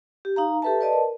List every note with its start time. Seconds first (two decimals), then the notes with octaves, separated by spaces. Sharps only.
0.25 G4
0.36 D#4 F5 A#5
0.62 G4 A4 B4 E5 A5
0.81 B4 D5 D#5 A5
0.93 A#4